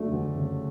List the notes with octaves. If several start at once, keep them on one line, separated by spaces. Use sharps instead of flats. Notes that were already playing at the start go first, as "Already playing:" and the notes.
Already playing: D2 C#3 F#3 A3 D4 F#4
D2
C#3